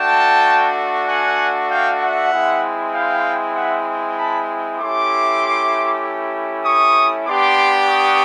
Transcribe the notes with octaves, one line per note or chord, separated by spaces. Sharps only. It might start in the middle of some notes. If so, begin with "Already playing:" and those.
Already playing: A3 D4 F#4 G5 A5
F#5 G#5
F5 G5
E5 F#5
G#3 C4 E4
F5 G5
E5 F#5
A5 B5
A3 C#4 E4 G4 C6 D6
C#6 D#6
B3 D4 G4 C6 D6
C#6 D#6